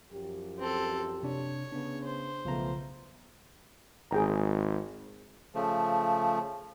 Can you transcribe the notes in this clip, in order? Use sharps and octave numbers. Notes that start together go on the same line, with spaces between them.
F#2 F3 G4
C4 A4
C3 D4 C#5
C#3 B3 D4
C5
B1 C#3 F3 A3 B3 A#5
G#1 G#4 G5 A#5
C#3 F3 A3